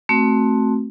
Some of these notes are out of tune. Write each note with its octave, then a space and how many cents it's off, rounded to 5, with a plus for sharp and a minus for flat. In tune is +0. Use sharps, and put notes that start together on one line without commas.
A3 +0 C4 +10 F#4 +0